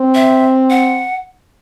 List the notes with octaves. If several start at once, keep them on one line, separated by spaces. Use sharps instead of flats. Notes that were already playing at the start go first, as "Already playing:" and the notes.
Already playing: C4
E5
F#5